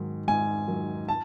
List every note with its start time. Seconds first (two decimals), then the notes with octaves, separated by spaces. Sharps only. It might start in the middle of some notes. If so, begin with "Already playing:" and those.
Already playing: G#2 D#3 F#3
0.28 G#2 G#5
0.68 D#3 F#3
1.09 A5